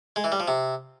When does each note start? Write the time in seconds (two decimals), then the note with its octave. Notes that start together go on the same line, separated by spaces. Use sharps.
0.16 G#3
0.24 E3
0.32 G3
0.40 F3
0.48 C3